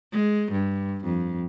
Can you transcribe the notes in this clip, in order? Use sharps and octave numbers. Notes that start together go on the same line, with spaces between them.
G#3
G2
F2